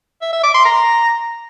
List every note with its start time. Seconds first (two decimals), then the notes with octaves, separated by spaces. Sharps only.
0.22 E5
0.33 E5
0.44 D6
0.54 C6
0.65 A#5